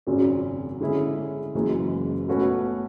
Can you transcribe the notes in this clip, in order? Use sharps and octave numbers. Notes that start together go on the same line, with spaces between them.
G#1 F#2 C#3 F#3 C#4
D3 G#3 C#4 E4 G#4
F#1 F#2 C#3 E3 G#3
B2 A3 C#4 F#4 B4